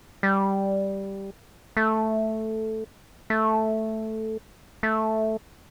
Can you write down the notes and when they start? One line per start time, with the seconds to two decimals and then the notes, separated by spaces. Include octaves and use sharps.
0.23 G3
1.77 A3
3.30 A3
4.83 A3